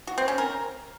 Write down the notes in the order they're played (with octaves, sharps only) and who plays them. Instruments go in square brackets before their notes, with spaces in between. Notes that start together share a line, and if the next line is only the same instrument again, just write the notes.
[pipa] F#4
C4
C#4
A#4